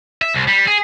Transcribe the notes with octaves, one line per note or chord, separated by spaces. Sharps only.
E5
C2
G3
G#4